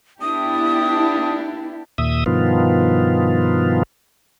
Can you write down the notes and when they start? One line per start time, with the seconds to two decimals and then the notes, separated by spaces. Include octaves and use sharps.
0.21 B3 D4 E4 G4 D#6
1.98 D#2 A#2 E5 D#6
2.26 G2 B2 D#3 F3 B3 F4